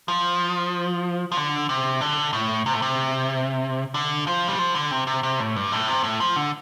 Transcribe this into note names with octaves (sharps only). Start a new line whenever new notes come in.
F3
F3
D3
C3
D3
A2
C3
A2
C3
D3
F3
G3
F3
D3
C3
C3
C3
A2
G2
A2
C3
A2
F3
D3